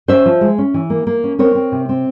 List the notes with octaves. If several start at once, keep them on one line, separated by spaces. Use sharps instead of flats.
C#4 C5 E5
F3
G#3
C#4
E3
A#3
A#3
C#4
C4 A#4 C#5
C4
C3
C4